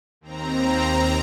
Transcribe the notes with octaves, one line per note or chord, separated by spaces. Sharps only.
D#2 C4 A#5